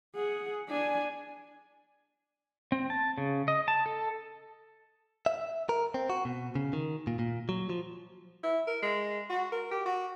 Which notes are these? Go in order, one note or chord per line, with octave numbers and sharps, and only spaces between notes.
G#4 F#5
D4 G#5
C4
A5
C#3
D#5
A5
A4
E5
A#4
C4
F#4
B2
C#3
D#3
A#2
A#2
F#3
F3
E4
A#4
G#3
F#4
A#4
G4
F#4